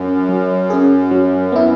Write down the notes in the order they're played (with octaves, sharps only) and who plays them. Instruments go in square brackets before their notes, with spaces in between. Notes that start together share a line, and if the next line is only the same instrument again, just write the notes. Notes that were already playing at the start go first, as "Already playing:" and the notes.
Already playing: [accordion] F#2
[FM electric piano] F#3
C#4 G#4
F#3
B3 E4